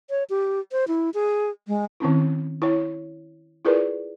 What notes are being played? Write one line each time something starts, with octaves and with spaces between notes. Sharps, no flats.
C#5
G4
C5
E4
G#4
G#3
D#3 C4 C#4 E4
E4 C#5
E4 F4 G#4 A#4 B4 D5